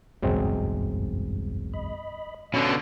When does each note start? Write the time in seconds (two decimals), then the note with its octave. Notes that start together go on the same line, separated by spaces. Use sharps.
0.22 F#1 B1 E2 G2 F#3 G#3 C4
1.73 D#5 B5
2.54 B2 D3 C#4 F5